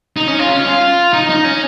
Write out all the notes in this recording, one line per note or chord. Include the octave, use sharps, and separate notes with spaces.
D#4
C#4
F4
C#4
F4
D#4
D#4
C#4